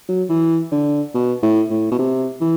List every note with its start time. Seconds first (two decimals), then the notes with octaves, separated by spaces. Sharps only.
0.08 F#3
0.29 E3
0.72 D3
1.14 B2
1.43 A2
1.70 A2
1.92 B2
1.99 C3
2.40 E3